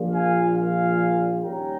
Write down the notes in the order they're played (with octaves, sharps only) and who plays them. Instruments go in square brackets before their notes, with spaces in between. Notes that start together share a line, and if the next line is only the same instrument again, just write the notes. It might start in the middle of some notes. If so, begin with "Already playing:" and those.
Already playing: [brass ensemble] A#1 A#2 F3
F5 G#5
F5 G#5
D#2 D#3 G3 C#4 G5 A#5